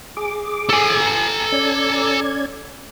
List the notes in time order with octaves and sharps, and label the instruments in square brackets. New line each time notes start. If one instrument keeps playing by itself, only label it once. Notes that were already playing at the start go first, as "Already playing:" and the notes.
[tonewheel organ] G#4 D6
[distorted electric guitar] A4 G#5
[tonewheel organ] C#4 D5 G#6